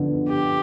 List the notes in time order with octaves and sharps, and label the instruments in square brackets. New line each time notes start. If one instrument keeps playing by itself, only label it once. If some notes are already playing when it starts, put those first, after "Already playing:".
Already playing: [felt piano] D3 F3 B3
[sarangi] G4